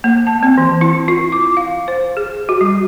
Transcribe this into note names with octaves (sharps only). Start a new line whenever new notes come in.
A#3
A5
C4
E3
E4
F4
D6
F5
C5
G#4
F#4
G3